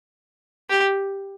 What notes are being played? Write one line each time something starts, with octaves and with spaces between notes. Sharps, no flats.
G4